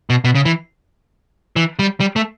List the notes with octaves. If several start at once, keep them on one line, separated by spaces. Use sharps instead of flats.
B2
B2
C#3
E3
E3
G3
G3
A3